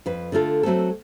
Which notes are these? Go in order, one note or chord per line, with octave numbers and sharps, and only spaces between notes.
F2 B4
D3 A3 F4 A4
F#3 A3 C4 A4